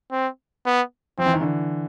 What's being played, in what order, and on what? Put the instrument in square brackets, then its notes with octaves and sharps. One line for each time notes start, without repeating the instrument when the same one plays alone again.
[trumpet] C4
B3
[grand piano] F3 [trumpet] C4
[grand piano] E3
D#3
D3 E3